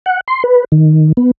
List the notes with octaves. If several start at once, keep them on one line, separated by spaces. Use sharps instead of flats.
F#5
C6
B4
D#3
B3